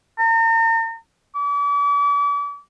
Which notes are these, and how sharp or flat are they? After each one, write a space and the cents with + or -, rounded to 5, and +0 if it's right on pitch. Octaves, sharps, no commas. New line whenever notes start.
A#5 -40
D6 -40